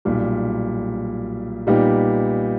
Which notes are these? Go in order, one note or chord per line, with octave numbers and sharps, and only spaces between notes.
B1 A#2 G3
A#2 G3 B3 D#4 G4